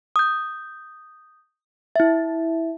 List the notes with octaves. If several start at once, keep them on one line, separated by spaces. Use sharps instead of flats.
D#6 G6
E4 E5